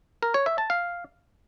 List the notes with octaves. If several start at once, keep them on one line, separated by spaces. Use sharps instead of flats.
A#4
C#5
E5
A5
F5